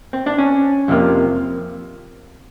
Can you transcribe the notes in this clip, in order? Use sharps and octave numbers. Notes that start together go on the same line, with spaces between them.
C4
D4
C#4
F2 C3 F3 A#3